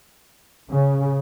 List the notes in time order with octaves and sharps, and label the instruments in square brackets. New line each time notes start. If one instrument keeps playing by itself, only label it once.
[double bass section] C#3